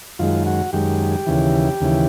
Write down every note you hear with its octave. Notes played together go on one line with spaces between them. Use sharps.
F#2 D#3 G#3 F4
F#4
F#2 D#3 G#3 G4
D#2 C#3 E3
D#2 C#3 E3